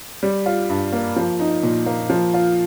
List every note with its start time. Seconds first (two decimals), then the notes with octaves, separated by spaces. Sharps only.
0.23 G3
0.46 F4
0.69 G2
0.92 A#3
1.16 F3
1.40 D#4
1.63 A#2
1.86 A#3
2.10 F3
2.34 F4